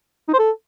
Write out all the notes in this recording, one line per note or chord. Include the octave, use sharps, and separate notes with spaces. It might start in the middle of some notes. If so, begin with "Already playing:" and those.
D#4
C5
A4